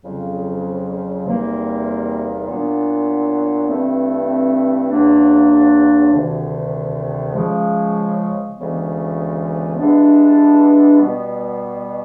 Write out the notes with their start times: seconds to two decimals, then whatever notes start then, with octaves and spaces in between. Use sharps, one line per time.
0.03 F2 C#3 F#3
1.25 E2 C3 D#3 G3 A#3
2.48 A#2 F#3 B3 D4
3.69 G2 E3 A3 C4
4.90 E2 C#3 F#3 A#3 D4
6.12 D2 C3 D#3
7.34 C#3 F3 G#3
8.56 D2 C#3 E3 G#3 B3
9.78 G2 E3 G#3 B3 D4
11.00 B2 G3 B3